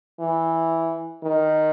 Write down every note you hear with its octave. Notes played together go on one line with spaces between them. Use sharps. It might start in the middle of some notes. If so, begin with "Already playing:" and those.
E3
D#3